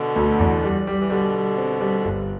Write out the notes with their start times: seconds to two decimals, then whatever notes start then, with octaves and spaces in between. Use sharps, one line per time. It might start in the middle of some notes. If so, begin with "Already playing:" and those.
Already playing: B2 D3
0.16 D2
0.39 E2
0.63 G3
0.87 G3
1.00 E3
1.10 B2 D3 G3
1.34 G3
1.57 C4
1.80 G3
2.05 G1